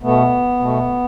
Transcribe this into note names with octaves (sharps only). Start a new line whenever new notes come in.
B2 A3 B3
B2 A3